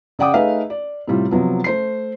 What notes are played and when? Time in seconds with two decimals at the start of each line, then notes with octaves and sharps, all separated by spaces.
0.19 C#3 D5 F#5 G5 D6 D#6
0.34 A3 D#4 G#4 B4 E5 F5
0.70 D5
1.07 A2 C3 G3 F4
1.31 C3 F3 F#3 B3
1.64 A3 C5 C7